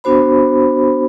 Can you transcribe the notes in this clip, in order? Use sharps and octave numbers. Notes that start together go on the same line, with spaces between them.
B3 D4 F#4 C5 B5